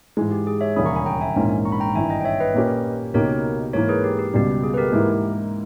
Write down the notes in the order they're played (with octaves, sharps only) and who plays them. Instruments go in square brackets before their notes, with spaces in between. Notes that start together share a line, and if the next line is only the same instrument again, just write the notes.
[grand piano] G#2 E3 G#3
[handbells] G4
G#4
C#5 E5
[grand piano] E1 D#2 C#3 G3 C#4 [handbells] B5 D#6
[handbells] A#5 C#6
G#5 B5
G5 A#5
E5 G#5
[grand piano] A#1 G#2 E3 A#3 C#4
[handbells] A#5 C#6
B5
G5 A#5
[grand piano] G#1 G2 E3 [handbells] E5 G#5
[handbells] D#5 G5
G5
C#5 E5
B4 D#5
[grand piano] A#2 A#3 C#4 G4
[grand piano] C#2 B2 A#3 D#4 G4 [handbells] A#4 C#5
[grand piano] G#2 E3 A#3 [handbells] A#4 C#5
[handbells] G#4 B4
G4
G4
[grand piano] C#2 B2 G3 [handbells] G4
[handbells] G#4
B4
G4 A#4
[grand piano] G#2 E3 A#3 E4